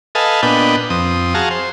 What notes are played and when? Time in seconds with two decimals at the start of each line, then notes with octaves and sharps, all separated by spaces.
0.15 A4 B4 D#5 F5 G#5 A5
0.43 A#2 B3 D4 B4 D#5 G5
0.90 F2 C4 D#6
1.34 F#4 G#4 F5 A5 A#5
1.51 C5